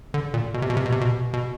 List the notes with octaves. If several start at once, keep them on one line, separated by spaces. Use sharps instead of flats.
D3
A#2
B2
C3
B2
C3
B2
C3
B2
B2